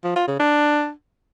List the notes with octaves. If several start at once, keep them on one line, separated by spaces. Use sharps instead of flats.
F3
F4
C#3
D4